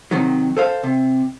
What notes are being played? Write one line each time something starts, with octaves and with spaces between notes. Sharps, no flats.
C3 D#3 F#3
A4 C5 F5
C3